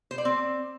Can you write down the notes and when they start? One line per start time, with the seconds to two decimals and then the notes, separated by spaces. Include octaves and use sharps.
0.11 C5
0.18 D5
0.25 C4